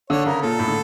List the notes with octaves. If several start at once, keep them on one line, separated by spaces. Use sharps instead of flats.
D3 C#5
C#3 A#4
A#2 A4
A2
D3